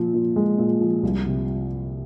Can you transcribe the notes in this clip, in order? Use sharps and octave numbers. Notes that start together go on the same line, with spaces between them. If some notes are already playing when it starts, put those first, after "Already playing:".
Already playing: A#2 F3
A#2
G#3
A#2
F3
C2
C3